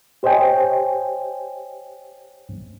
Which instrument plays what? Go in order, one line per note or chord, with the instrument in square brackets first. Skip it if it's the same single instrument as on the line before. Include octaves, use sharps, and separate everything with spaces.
[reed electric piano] G4 C5 C#5 D#5 G5 G#5